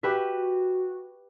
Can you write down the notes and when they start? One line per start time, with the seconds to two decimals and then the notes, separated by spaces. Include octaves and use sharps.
0.03 F#4 G4 B4 E5